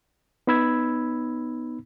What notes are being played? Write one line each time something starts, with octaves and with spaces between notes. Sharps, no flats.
B3 D#4 B5 E6 G#6